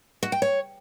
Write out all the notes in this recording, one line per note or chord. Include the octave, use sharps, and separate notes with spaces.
F#4
G5
C#5